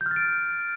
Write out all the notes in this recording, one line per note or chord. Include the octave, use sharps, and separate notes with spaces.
G6
F6
A6
D7